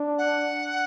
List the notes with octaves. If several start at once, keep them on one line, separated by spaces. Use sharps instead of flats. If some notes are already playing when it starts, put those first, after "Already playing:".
Already playing: D4
F#5